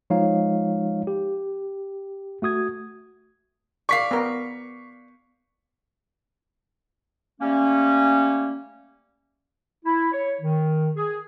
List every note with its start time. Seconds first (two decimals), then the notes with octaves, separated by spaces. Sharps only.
0.10 F3 G#3 D#4 F4 C#5 F5
1.07 G4
2.42 A3 F#4 D#6 G#6
3.89 D5 F5 C#6 B6 C7
4.11 B3 A#4
7.41 G3 A3 A#3 C#4
9.85 E4
10.12 C#5
10.40 D#3
10.95 G#4